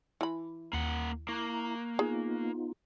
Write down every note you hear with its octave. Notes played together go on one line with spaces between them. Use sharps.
E3 E4 B5
D#2 A#3 F#5
A#3 E4 A#5 C#6 F#6
B3 D#4 F4 G#4